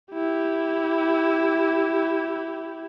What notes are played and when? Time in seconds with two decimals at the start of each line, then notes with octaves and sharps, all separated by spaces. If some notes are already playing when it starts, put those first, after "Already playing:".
0.12 E4 G4